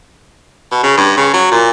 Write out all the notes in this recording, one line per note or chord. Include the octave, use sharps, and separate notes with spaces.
B2
C#3
G2
C#3
F#3
A#2